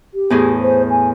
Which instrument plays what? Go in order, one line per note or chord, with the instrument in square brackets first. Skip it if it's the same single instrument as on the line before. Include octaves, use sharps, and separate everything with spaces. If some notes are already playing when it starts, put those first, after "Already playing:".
[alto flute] G4
[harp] E2 A2 G#4
[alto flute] C5
G#5